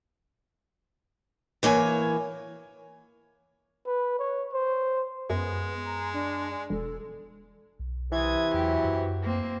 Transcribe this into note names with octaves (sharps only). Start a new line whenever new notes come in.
E3 A#3 C#5 G#5
B4
C#5
C5
F#2 G#3 B3
A#5
D4
E1 A4
B1
C3 E3 D#6 G#6
E2 F#3 G4
F#2
A#3 C4